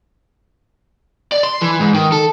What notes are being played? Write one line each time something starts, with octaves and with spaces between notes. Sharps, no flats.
D5
C6
E3
G#2
D#3
A4